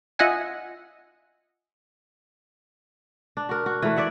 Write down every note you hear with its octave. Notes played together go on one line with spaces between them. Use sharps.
F4 D#5 E5 F#5 G#5
D4
F#4 A#4
F#4
E3 A3
D5 E5 F#5